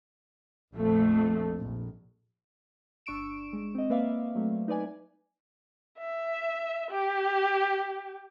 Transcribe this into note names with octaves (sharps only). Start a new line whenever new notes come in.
A#1 F2 A3
A#1
G1 D4 C#6 E6 D7 E7
G#3
C4 D#5
A#3 B4 D5 E5 F5
F#3 A3 C4
D#4 B4 D5 G#5
E5
G4